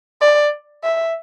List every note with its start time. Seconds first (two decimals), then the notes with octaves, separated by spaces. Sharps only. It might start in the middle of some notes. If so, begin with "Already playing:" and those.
0.21 D5
0.83 E5